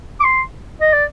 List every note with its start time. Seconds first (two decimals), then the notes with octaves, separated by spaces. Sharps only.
0.20 D6
0.24 C6
0.81 D#5
0.93 D5